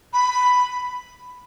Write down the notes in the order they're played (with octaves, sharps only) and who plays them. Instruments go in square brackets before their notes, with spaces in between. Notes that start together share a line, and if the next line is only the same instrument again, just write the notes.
[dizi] B5